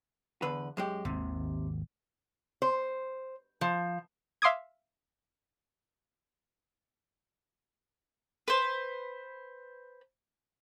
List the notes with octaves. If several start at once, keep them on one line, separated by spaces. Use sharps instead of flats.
E2 D3 B4
F#2 G#3 G4
G#1 D#2 G#2 C3
C5
F3
E5 F5 C6 D6 D#6 G#6
B4 C5